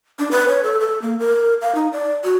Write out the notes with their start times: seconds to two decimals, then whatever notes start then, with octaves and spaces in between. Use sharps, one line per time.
0.19 D4
0.31 B4
0.48 C#5
0.63 A4
0.81 A4
1.02 A#3
1.20 A#4
1.62 F5
1.75 D#4
1.93 D5
2.24 F#4